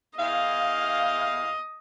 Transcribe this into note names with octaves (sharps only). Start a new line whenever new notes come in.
E2 E4 D#5 F5